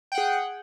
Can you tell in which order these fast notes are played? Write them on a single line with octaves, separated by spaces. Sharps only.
G5 F#5 G#4